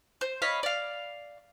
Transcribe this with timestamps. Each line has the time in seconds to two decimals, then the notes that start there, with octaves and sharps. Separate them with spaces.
0.21 C5
0.42 C#5 D#5 F5 B5
0.63 D5 F5